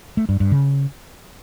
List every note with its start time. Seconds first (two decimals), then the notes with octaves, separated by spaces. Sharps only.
0.17 A3
0.29 G2
0.40 G2
0.52 C#3